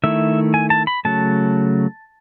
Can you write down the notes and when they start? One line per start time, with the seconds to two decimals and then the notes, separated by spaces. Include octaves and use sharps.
0.03 D#3 A3 E4 E5
0.54 G#5
0.70 A5
0.87 B5
1.05 C#3 F#3 A3 A5